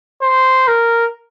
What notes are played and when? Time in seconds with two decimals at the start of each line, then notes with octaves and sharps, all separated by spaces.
0.22 C5
0.68 A#4